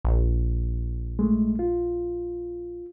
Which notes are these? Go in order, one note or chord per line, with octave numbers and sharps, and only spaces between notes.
A#1
G#3 A3
F4